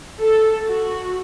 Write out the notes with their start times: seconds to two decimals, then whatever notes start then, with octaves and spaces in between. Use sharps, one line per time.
0.20 A4
0.65 F#4